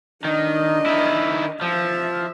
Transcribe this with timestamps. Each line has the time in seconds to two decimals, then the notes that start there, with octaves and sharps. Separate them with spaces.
0.24 D#3 D4 D#5
0.86 D#3 E4
1.61 F3 E5